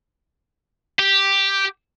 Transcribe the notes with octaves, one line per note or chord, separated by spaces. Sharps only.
G4